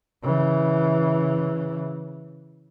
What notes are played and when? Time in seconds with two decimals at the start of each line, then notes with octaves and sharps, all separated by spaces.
0.23 C#3 E3